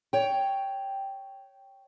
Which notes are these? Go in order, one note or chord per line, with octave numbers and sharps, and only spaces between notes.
C#5 G5